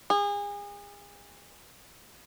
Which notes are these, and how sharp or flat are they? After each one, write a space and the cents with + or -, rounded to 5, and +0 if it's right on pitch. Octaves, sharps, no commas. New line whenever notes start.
G#4 -35